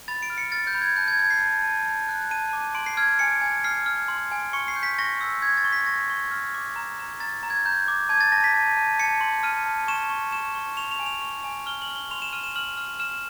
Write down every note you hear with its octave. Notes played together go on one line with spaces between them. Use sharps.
B5 A6
D7
F6
C#7
F6 A6
G6
B5
G#6
A5 G6
G#6
A5 G#6
C7
A5
A5
A5
F#6
A5 D#7
D6
C6 D7
C7
F6 G#6
G#5 C#7
G#5
F6 C7
F6
C6
G#5
C#6 C#7
C7
G6
B6
C#6 A#6
E6
G6 G#6
A6
C#6
B6
C#6 A#6
C#6
F6
D6
A#5
A#5
A#5 A6
A#5
G#6
A#5 G6
D6
A5 G#6
A6
A5 A#6
B6
A5
A5
A5 C#7
C6
F6 D#7
A5
C#6 E7
C#6
C#6 E7
C#6
C#6 F7
F7
G#5
F7
C#6
G#5
F6 G7
F#7
F6
G7
C6 F7
E7
F6 D#7
E7
F6 F#7
F6
F6 E7